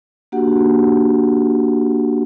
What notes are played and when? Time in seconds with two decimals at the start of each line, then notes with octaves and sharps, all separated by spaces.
0.32 A#3 D4 F#4 G4 F#5